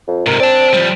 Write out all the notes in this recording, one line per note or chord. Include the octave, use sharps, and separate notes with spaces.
F2
G#2 C3 A#4
C4 D5 A5
F3 G3